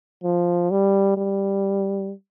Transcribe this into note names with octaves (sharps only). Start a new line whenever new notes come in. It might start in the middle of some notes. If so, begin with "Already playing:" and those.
F3
G3
G3